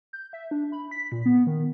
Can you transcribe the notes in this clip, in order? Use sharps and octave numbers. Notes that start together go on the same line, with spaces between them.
G6
E5
D4
B5
B6
A#2
B3
D#3